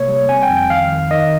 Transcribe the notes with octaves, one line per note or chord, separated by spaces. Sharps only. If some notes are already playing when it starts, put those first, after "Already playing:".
Already playing: C3 A#3 C#5
G3
C4 G#5
G5
F2
G5
D#3 F5
D#3
D#3 D#5